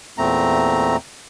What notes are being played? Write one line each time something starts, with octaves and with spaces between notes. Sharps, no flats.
E2 A#2 A3 C4 A#5